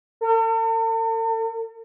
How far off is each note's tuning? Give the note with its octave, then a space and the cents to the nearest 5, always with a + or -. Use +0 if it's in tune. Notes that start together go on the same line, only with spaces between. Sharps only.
A4 +45